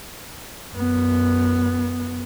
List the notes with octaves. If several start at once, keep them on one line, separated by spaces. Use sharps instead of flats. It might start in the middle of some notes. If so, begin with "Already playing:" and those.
F#2 B3